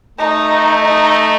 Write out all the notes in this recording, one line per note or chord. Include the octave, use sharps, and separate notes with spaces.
A3 D#4
D#4